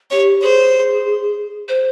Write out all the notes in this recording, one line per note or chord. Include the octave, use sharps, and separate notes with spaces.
G4 C#5
G#4 C5
C5